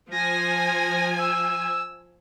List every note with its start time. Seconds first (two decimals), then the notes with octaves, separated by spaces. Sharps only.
0.11 F3 G#5 A#6
1.19 E6